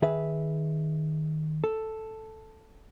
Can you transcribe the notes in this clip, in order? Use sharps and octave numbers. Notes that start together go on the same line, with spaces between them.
D#3 G#4 B4 E5
A4